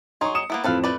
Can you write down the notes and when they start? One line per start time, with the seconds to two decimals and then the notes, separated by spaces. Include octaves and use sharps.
0.21 F#3 D#4 G#4 C6 C#6
0.35 D#6 C#7 E7
0.50 A#3 B3 E4
0.64 F2 A2 C4 A4 B4 F5
0.84 A3 B4 D5